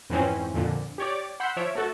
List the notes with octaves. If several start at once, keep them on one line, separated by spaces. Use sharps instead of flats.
F2 G#2 E3 C4 C#4
F2 A#2 D3
G4 C#5 D5 D6
F#5 B5 C6 E6 G6
F3 C#5 E5 D7
A3 F#4 A4